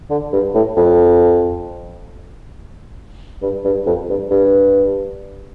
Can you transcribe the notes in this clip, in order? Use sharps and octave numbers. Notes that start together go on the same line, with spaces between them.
D3
G2
A2
F2
G2
G2
F2
G2
G2